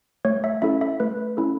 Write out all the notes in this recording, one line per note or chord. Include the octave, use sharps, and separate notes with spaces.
A3 C#5
E5
C#4 E4 A4 E5
E5
A3 B4
C#4 E4 A4